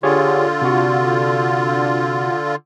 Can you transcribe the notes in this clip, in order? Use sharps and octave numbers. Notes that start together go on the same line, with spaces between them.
D3 F4 G4 G#4 C#5
C3 F#4